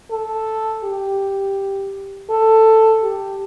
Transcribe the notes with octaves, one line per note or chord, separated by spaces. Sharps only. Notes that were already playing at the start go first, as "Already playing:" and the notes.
A4
G4
A4
G4